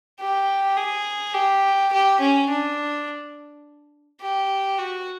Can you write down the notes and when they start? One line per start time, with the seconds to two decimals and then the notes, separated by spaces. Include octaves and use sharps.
0.20 G4
0.77 G#4
1.34 G4
1.92 G4
2.20 C#4
2.49 D4
4.21 G4
4.78 F#4